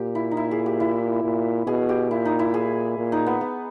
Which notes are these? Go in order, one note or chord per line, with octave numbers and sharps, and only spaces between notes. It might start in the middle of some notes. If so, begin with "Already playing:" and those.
Already playing: A#2 G4
E4
D#4
E4
G#4
G4
E4
A#2
B2 G#4
G4
A#2 E4
D#4
E4
G#4
A#2
D#4
B3
B3